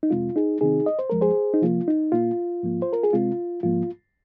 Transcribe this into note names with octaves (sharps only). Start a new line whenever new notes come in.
D#4
F2 C3 G#3 C4 F4
D#4 G#4
C3 D#3 C4 D#4 G#4
D#5
C5
F2 F3 G#3 A#4
G#4 C5
D#4
C3 F3 A#3 F4
D#4
A#2 A#3 F4
G#2 F3 A#3
C5
A#4
G#4
C3 G#3 C4 F4
G#2 F3 A#3 F4